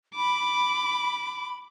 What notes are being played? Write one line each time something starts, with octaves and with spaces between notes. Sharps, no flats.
B5 D6